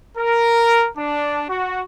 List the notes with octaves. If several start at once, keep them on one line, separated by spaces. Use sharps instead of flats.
A#4
D4
F#4